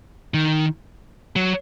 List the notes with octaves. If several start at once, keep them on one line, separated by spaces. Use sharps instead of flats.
D#3
F#3